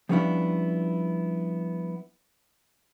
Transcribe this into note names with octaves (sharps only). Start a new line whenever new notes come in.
F3 G3 B3 C#4 D4 E4